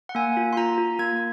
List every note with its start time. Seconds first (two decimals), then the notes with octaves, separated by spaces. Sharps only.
0.09 F#5
0.15 A#3 G#5
0.37 F4
0.53 C6
0.57 F4 A#5
0.78 F4
0.99 A#3 G#6